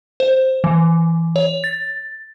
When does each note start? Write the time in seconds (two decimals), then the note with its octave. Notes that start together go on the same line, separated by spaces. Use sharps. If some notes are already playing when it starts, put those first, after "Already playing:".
0.20 C5
0.64 E3
1.36 C#5
1.64 A6